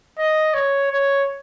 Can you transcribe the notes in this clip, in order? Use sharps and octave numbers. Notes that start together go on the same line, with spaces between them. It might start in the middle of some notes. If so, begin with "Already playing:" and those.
D#5
C#5
C#5